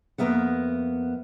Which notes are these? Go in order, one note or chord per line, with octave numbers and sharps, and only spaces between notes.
F2 F3 A#3 B3 E5 F#5